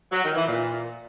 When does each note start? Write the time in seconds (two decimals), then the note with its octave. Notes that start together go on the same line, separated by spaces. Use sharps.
0.12 F#3
0.24 D#3
0.35 E3
0.47 A#2